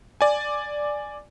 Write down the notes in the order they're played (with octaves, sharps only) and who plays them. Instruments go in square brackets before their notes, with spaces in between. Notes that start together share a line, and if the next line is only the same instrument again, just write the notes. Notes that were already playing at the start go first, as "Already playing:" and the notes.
[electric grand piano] D5 G#5